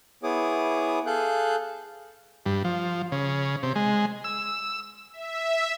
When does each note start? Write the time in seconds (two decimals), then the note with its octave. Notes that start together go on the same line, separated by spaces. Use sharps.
0.23 B3 E4 G#4 C#5 D6 D#6
1.06 G#4 A4 F5 F#6 G6
2.46 G2
2.64 F3
3.12 C#3
3.63 C3
3.76 G#3
4.24 E6
5.13 E5